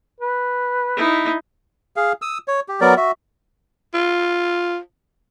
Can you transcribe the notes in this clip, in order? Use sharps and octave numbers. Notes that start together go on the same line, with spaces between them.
B4
D#4 E4
G#4 F5
D#6 E6
C#5
G4
F#3 B3 A#4 D5
F#4 E5
F4